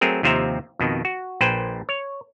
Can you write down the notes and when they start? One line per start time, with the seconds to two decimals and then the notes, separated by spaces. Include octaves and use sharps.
0.01 F#3 A3 C4 G#4 A#4
0.23 D#2 C3 F3 C4 E5 A#5
0.79 F2 B2 D#3
1.05 F#4
1.41 A#1 A#2 B4 C5 G5
1.89 C#5